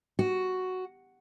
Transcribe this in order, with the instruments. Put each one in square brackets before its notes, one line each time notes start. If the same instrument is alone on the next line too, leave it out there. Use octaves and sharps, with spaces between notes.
[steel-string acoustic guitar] F#4